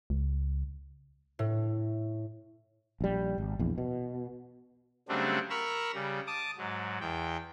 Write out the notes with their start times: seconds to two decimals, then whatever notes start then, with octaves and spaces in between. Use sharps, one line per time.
0.10 C#2
1.39 A2
3.01 A#1 G3
3.38 G#1
3.59 A#1 E2
3.78 B2
5.09 C#3 F#3 G3 A3 C4 D4
5.50 A#4 A#5 B5 C#6 E6
5.94 C#3 G3
6.27 A5 D6 D#6
6.58 G#2 F#3
7.00 E2 G5